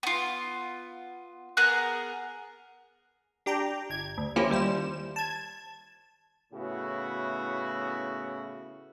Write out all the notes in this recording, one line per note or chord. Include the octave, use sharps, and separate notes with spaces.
B3 F4
B3 G#4 A#4 F#6
D4 G4 G5 A#5
G1 G#6
D2
F3 A#3 C#4 E4 F4 G4
D#2 G3 C5 E7
A5 G#6
A2 C#3 B3 E4 F#4